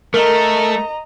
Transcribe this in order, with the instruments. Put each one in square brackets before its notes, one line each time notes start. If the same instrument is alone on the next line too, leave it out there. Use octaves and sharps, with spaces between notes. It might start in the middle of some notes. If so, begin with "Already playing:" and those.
[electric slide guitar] A3 [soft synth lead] A#4 [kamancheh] D#5 A#5